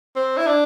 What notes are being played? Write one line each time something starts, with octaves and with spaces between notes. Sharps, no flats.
C4
E4
D4